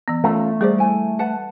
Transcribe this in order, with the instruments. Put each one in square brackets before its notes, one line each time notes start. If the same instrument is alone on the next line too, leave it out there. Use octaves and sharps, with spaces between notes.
[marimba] E3 B3
[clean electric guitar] A3 [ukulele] C#4 F4 F5
[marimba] G3 C5 [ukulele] G#4 A#4 D5
[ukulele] E4 G#5
B4 F#5 A5